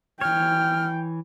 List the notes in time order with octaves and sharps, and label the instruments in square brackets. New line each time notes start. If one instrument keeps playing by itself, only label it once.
[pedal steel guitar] E3 C#5 [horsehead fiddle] G5 [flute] F6